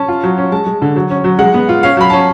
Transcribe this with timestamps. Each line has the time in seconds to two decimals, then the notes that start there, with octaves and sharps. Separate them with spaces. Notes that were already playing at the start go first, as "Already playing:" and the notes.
Already playing: C#4 A5
0.08 F4
0.23 F#3
0.38 C#4
0.52 G#3 A5
0.67 G#3
0.82 D3
0.96 F#3
1.10 C#4
1.24 F#3
1.39 G#3 F#5
1.54 B3
1.69 F4
1.83 C#4 F5
1.97 F#3 B5
2.10 C#4 A5